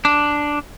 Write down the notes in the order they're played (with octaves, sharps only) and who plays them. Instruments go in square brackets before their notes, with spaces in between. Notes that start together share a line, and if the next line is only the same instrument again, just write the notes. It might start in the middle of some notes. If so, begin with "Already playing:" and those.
[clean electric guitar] D4